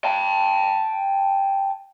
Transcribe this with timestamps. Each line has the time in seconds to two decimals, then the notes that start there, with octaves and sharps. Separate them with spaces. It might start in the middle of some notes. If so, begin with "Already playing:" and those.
0.05 G5 A5